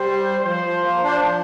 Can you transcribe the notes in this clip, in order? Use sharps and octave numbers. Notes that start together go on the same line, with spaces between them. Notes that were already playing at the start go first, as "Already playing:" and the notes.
Already playing: G3 C5
F3 C5
F3
A#3
D4
F3